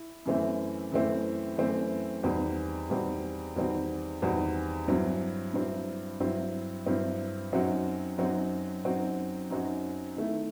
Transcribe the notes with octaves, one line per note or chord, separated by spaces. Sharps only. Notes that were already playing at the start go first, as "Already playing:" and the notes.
Already playing: E4
F#2 E3 A3 C4 E4
F#2 E3 A3 C4 E4
F#2 E3 A3 C4 E4
E2 D#3 G3 C4 F#4
E2 D#3 G3 C4 F#4
E2 D#3 G3 C4 F#4
E2 D#3 G3 C4 F#4
G2 F#3 C4 E4
G2 F#3 C4 E4
G2 F#3 C4 E4
G2 F#3 C4 E4
F#2 F#3 C4 D#4 F#4
F#2 F#3 C4 D#4 F#4
F#2 F#3 C4 D#4 F#4
F#2 F#3 C4 D#4 F#4
D#3 A3 E4